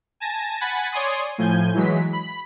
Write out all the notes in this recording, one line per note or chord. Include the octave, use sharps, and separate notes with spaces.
G#5 A5 A#6
F#5 G#5 B5 A6
C#5 D5 G#5 C6 D#6
A2 F3 G#5 G6
E3 F#3 G#3 B6
B5